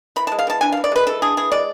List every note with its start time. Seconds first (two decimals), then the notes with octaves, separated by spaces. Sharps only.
0.16 E3 B5
0.27 G#3 A5
0.39 F5
0.47 E3 A5
0.61 D4 G#5
0.72 E3 F5
0.84 D5
0.92 G#3 B4
1.07 E3 A4
1.22 D4 G#4
1.37 E3 G#4
1.52 G#3 D5